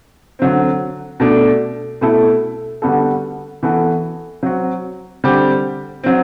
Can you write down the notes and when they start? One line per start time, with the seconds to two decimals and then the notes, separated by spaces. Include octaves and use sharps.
0.39 D3 F#3 C4
1.20 B2 A3 D4
2.01 B2 A3 E4 A4
2.82 D3 G3 B3 F#4 A4
3.63 E3 B3 F#4 A4
4.43 F#3 C4 F#4
5.24 D3 G3 C4 G4
6.04 F#3 C4